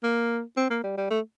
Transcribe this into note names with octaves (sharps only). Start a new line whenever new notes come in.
A#3
C4
A#3
G3
G3
A3